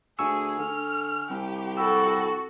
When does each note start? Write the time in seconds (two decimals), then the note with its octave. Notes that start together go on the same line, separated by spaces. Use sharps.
0.19 D2 G#4 G#5 C#6 E6
0.59 D3 F6
1.30 C2 G4
1.77 F#4 A4 G5 B5 E6